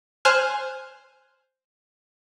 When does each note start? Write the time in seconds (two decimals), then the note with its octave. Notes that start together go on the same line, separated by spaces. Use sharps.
0.25 C5 G#5 F6 F#6